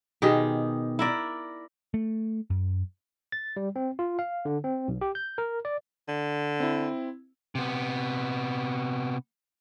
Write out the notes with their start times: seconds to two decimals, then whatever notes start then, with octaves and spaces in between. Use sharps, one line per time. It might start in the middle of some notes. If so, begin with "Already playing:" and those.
0.22 B2 D#3 G4 G#4
0.99 E4 A#4 D5
1.94 A3
2.50 F#2
3.32 A6
3.57 G3
3.76 C4
3.99 F4
4.19 F5
4.45 D3
4.64 C4
4.88 B1
5.01 G4
5.15 G6
5.38 A#4
5.65 D5
6.08 D3
6.60 C4 E4
7.55 C3 B3